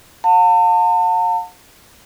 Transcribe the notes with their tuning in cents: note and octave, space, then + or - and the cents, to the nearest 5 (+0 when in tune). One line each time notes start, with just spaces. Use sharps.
F5 +45 A5 +40